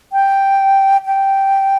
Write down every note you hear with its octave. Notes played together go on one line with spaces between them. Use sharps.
G5
G5